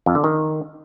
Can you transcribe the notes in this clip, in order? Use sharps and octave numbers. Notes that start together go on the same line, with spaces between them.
F2
D3
D#3